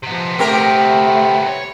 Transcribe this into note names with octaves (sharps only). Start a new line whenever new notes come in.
C3 F3 B3
A3 C4 G4 A#4
C#5